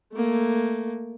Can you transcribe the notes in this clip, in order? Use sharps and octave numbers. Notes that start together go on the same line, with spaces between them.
A3 A#3